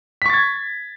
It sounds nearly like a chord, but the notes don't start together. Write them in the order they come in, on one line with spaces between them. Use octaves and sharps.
B6 C#6 A6 G#6